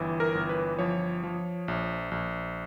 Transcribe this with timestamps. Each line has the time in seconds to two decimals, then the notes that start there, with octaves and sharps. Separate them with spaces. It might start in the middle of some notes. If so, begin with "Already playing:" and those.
Already playing: G1 E3
0.20 A#4
0.35 G1
0.49 B4
0.79 F3 C#5
1.24 F3
1.68 A#1
2.11 A#1